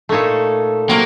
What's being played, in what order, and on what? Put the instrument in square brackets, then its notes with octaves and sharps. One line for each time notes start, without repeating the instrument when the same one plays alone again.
[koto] A#2 A3 D#4 A4 C#5
[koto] C3 F#3 [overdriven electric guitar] A#3